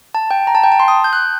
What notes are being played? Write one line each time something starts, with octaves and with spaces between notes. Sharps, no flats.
A5
G5
A#5
A5
G5
A5
C6
D#6
G6
F#6